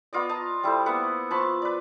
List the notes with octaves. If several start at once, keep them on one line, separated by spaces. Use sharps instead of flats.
B3 F4 D5 D#5
D#5 A5 A#5
G3 E4 A4 C5
A#3 B3 E5 F#5
F3 A5 B5 C#6
B4 D5